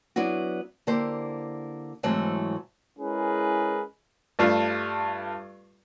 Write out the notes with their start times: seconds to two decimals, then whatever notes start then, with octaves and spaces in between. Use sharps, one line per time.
0.16 F#3 B3 D4 E4 F#4
0.87 D3 A#3 E4 G4 C5
2.03 G#2 E3 F#3 G#3 A3 C4
2.99 G#3 C#4 E4 G#4 A#4 B4
4.39 G2 G3 A3 F4